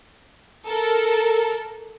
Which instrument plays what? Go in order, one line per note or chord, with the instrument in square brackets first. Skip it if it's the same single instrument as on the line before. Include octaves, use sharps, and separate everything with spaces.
[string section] A4 A#4